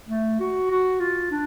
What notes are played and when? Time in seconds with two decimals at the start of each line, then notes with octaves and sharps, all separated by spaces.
0.08 A3
0.40 F#4
0.70 F#4
1.00 F4
1.31 D4